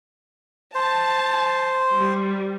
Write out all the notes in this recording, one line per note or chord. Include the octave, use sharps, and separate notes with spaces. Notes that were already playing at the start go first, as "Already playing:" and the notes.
C5 A5
G3